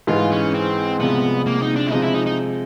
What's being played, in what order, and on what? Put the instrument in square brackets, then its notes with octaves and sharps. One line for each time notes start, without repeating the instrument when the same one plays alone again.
[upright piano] G#2 E3 G#3 [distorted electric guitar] F4
[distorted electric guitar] C#4
C4
[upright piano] C2 C3 F3 G#3 [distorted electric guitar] B3
[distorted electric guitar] A#3
D#4
D4
E4
[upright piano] C3 F3 G#3 [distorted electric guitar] D#4
[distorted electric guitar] E4
D#4
D#4